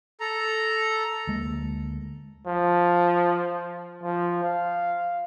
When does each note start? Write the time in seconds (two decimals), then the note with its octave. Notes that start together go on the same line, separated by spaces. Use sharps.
0.20 A4 A#5
1.27 D2 G#3 A#3
2.47 F3
4.03 F3
4.43 F5